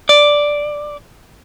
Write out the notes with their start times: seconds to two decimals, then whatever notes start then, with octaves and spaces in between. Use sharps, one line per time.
0.09 D5